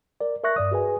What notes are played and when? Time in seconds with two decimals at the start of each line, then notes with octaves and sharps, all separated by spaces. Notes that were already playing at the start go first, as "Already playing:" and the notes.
0.21 A#4 D5
0.44 A#4 E5 C#6 F#6 A#6
0.56 G2 D5 D#6
0.71 F#4 G#4 B4 G#5